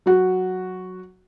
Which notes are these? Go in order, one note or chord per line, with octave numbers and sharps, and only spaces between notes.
F#3 F#4